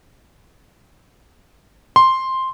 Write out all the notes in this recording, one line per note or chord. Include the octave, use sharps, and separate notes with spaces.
C6